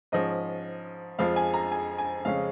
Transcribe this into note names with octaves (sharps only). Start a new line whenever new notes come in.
G#2 F3 C#4 D#5
F2 F3 G#3 F4 F5
G#5
A#5
G#5
G#5
F2 C#3 G#3 C#4 F5